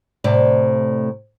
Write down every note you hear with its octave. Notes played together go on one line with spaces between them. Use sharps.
A2 C3 D5